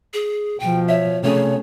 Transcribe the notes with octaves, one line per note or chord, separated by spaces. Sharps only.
G#4
B2 F3 G5
C#5 E5
C3 A3 C#4 G#4 C#5